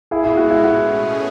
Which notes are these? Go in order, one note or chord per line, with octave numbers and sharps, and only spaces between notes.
A2 G#3 B3 E4 G#4
E4
F#4
E4
B2 A3 C#4 F#4 G#4